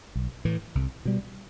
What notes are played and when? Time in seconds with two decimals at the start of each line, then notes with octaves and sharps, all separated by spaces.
0.15 B1
0.45 A2 E3
0.75 C2
1.05 B2 G3